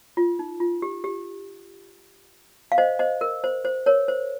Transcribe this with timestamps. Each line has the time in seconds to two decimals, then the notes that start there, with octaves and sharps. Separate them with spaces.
0.17 F4
0.39 D#4
0.60 F4
0.82 G4
1.04 G4
2.72 F5
2.78 C5 D#5
2.99 C5 D#5
3.21 A#4
3.44 C5
3.65 C5
3.86 A#4 C#5
4.08 C5